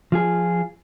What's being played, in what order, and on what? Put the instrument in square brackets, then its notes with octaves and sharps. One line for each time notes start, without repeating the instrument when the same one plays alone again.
[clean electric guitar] F3 F4 G#4